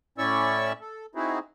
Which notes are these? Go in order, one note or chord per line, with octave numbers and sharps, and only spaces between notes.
A2 C#4 E4 D5 C#6 E6
A4
C4 D#4 E4 F#4 G#4